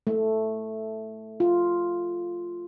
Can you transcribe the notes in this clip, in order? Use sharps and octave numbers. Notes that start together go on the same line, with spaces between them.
A3
F4